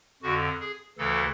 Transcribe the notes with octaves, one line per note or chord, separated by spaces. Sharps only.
F2 D3 F#4
G#4
D2 C#3 E3 A4